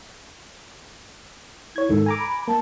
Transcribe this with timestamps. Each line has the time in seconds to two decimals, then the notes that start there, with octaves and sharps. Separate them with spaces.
1.76 E4 C#5 G#6
1.89 G#2 D#3 A4
2.06 G#5 A#5 D6
2.19 B5
2.48 A#3 A5